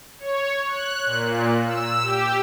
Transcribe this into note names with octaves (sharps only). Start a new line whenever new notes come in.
C#5
F#6
A#2
E6
G4